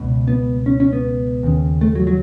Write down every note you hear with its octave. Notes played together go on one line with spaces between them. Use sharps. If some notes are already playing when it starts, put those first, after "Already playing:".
Already playing: C#2 B2
B3
C#4
C#4
B3
D#2 C#3
A3
F#3
F#3